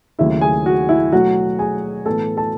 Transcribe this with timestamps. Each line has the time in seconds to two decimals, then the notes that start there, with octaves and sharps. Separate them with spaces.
0.19 D#2 C#3 F#3 A3 E4 E5
0.41 G#4 G#5
0.66 F#4 F#5
0.89 E4 E5
1.12 B2 F#3 A3 F#4 F#5
1.59 G#4 G#5
2.06 A2 E3 B3 A4 A5
2.37 A4 A5